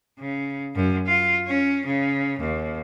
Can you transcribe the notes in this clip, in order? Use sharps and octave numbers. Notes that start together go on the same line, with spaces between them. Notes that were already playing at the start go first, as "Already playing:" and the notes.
C#3
F#2
F4
C#4
C#3
D#2